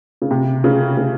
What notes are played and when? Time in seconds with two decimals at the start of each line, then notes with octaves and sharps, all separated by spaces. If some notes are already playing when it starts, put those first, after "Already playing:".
0.22 C#3
0.31 C3
0.64 C#3
0.97 C#3